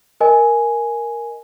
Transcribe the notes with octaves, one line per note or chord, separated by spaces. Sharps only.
A#4 D#5 G#5